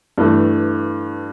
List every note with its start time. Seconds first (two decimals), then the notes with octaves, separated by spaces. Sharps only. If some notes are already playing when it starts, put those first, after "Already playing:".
0.18 G2 E3 A3